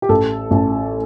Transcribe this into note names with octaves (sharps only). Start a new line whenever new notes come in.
G4
A1 A4
A1